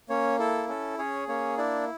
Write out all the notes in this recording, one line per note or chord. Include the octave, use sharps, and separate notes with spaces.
A#3 C#4 C#5
E4 A4
C#4 A4
C#4 G#4 C#5
A#3 C#4 C#5
D4 E4 D5